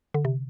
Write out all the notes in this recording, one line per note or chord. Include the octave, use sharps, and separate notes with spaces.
D3
C3